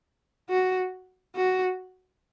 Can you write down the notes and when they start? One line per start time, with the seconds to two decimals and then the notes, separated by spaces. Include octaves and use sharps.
0.49 F#4
1.36 F#4